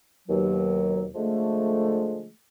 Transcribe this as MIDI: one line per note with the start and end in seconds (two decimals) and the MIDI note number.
0.28 1.06 39
0.28 1.06 47
0.28 1.06 54
1.15 2.29 50
1.15 2.29 53
1.15 2.29 56
1.15 2.29 57